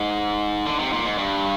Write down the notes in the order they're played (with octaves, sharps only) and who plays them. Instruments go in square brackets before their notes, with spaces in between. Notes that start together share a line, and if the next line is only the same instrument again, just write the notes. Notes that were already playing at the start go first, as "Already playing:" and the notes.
Already playing: [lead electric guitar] G#2
D3
C3
A#2
G#2
G2